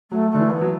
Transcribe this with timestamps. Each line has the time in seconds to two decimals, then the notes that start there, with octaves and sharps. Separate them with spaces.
0.11 F#3 A3
0.31 D3 A3
0.39 E3
0.49 B3
0.61 F#3